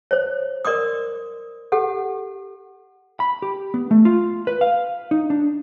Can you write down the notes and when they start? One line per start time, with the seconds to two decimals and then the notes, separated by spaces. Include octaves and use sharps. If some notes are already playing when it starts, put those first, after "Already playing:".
0.11 C5 C#5
0.65 A#4 D5 C6 D6 D#6
1.72 G4 A4 F#5
3.20 B5
3.42 G4
3.74 B3
3.91 A3
4.05 F4
4.47 B4
4.61 F5
5.11 D#4
5.30 D4